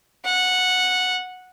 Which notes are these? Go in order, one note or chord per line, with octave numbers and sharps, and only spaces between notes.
F#5